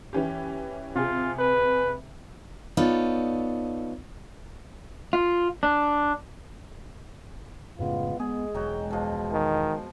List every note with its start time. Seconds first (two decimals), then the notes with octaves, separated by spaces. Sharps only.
0.13 E3 C#4 G4
0.96 C3 F4 G#4
1.39 B4
2.77 B3 D#4 F4 A4 C#5 D5
5.13 F4
5.63 D4
7.79 F#2 A2 C#3 G#3 B3 F4
8.20 G#3 B3 G#4
8.54 E1 F#3 G5 A#5
8.91 B2 F3
9.32 D#3